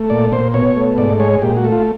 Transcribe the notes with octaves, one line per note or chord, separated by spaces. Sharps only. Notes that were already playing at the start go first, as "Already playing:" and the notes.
Already playing: A3
A#2 D5
A#2 C5
B2 C#5
A3
G#2 D5
G#3 C#5
A#2 G4
F#4
A3
F4